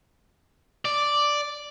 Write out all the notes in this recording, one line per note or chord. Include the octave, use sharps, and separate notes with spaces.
D5